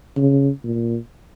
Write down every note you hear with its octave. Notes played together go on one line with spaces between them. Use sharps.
C#3
A#2